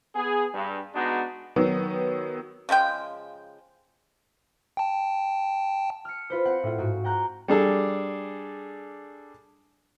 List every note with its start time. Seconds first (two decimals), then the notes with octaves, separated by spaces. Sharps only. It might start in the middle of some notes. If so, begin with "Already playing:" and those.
0.16 B3 G#4
0.53 G2
0.95 G#3 B3 D4 D#4 F#4
1.56 D#3 F#3 B3
2.69 C#3 F3 G#3 G5
4.77 G5 A5
6.05 F6 C#7
6.30 F4 B4 C5
6.45 C4 F#5
6.63 A2 F4
6.78 G#2 F#4
7.04 F#5 G5 A#5 F#6 G6
7.48 G3 D4 G#4 A4